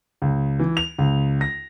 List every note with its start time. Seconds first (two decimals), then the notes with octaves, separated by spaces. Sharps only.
0.22 C#2
0.59 E3
0.77 F7
0.98 C#2
1.41 A#6